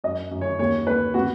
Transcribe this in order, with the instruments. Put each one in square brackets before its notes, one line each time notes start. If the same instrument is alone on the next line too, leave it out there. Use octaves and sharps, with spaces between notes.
[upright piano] F#2 D#5
F#2
C#5
D#2 C#5
D#2 B4
B3 F#4